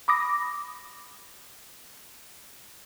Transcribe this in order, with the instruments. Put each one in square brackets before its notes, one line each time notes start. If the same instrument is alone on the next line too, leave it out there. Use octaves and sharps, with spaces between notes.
[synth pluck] B5 D6 D#6 A#6